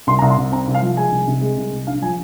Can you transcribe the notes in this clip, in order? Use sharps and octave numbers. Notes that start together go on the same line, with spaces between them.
C2 C6
A#5
C2
C6
C2
C4 A#5
C2
F5
F3
G#3 G#5
C2
C3
G#3
C2
C2
A#1 F5
F3 G#5